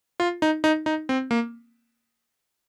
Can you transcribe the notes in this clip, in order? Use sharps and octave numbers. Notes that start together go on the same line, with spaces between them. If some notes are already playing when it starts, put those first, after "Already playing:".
F4
D#4
D#4
D#4
C4
A#3